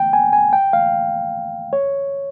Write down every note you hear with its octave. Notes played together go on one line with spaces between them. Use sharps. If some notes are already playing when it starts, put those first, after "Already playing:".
Already playing: G5
G#5
G#5
G5
F5
C#5